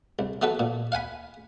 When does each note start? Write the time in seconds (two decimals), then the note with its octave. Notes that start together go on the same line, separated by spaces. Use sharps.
0.19 C2
0.42 E3 B3 F#4 A4 B4
0.59 A#2
0.92 F5 F#5 G#5 B5